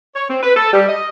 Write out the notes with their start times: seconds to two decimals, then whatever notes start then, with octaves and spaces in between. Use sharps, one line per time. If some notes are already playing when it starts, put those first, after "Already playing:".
0.16 C#5
0.30 C4
0.43 B4
0.56 A4
0.73 G3
0.89 D#5